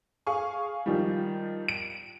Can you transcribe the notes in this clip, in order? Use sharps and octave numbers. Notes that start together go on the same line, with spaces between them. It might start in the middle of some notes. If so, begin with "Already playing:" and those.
G#4 F5 G#5 C#6
D#3 F3 G3
D7